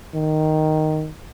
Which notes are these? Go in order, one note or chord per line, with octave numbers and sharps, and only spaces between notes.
D#3